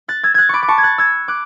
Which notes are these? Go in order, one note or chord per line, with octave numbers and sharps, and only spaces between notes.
F#6 A6
E6 G#6
F#6 G#6 A6
B5 C#6 D6
D6
A5 C#6
G#6
F#6 A6
E6 G#6
D6 F#6